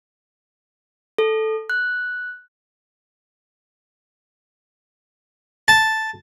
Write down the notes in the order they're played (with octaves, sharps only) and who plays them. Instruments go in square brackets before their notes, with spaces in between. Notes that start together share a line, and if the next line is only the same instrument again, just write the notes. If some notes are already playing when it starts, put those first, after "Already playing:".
[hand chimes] A4
F#6
[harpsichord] A5